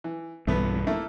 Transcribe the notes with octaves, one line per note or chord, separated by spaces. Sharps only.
E3
B1 G2 E3 A3 B3 B4
A3 A#3 E4